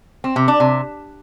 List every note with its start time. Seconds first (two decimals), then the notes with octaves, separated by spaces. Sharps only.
0.24 C4
0.36 C3
0.48 D4
0.60 C3